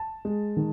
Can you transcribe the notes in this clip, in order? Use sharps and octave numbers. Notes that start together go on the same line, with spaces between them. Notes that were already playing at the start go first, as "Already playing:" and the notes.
Already playing: A5
G#3
D#3